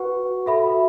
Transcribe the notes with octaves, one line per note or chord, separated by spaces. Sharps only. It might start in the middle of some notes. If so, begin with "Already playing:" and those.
Already playing: F#4 B4 F#5 C#6
F#4 A4 E5 B5